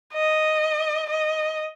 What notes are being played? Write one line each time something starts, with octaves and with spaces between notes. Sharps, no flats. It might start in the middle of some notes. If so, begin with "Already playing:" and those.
D#5
D#5